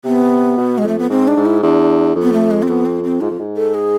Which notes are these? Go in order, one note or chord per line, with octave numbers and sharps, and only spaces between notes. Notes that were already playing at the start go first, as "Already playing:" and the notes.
C3 B3
B2
G#3
F2 A3
B3
G#2 C4
D4
G#2
E4
E2 D4
F2
B3
A3
G#3
C4
F2 B3
C4
C4
G#2 F4
F2
G#2
A4
G#4